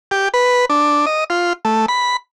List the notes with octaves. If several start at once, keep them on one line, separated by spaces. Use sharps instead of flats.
G4
B4
D4
D#5
F4
A3
B5